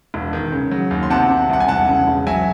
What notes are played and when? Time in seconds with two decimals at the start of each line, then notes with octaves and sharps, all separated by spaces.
0.14 E1
0.33 D#3
0.52 C#3
0.71 F#3
0.91 D#2
1.03 C6
1.10 C3 F#5 A5
1.30 C3
1.49 C2 F#5
1.60 G#5
1.68 E1 F#5 A5
1.88 C#3
2.07 E1
2.27 F#3 E5 G#5